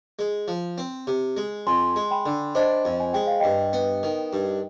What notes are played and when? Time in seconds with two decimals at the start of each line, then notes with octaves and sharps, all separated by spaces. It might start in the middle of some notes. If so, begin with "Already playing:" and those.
0.19 G#3
0.48 F3
0.78 C4
1.07 C3
1.37 G#3
1.67 F2 G#5 C6
1.96 G#3
2.11 G5 B5
2.26 D3
2.55 D4 C5 D#5
2.85 F2
3.00 G#5
3.13 G#3 G5
3.27 F5
3.40 G2 D#5 G5
3.73 B3
4.03 D#3
4.33 G2